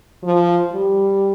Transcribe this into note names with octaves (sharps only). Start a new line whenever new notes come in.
F3
G3